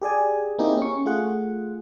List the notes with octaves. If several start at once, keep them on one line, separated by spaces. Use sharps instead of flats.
G4 G#4 D5 G#5
A#3 C4 D#4 E4 G4 G#4
C#4 C#6
A3 F4 G#4 F#5